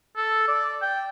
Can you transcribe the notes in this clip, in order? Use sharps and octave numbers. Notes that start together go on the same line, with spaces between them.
A4
D5
G5